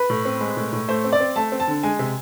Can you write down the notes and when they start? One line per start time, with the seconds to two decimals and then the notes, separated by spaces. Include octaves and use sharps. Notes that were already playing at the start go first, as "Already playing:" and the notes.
Already playing: B4
0.10 A2
0.25 C4
0.41 G#3
0.57 A2
0.73 A2
0.89 A3 C5
1.04 C4
1.13 D5
1.20 C4
1.36 A3 A5
1.52 C4
1.60 A5
1.68 D3
1.83 G#3 G#5
1.99 C3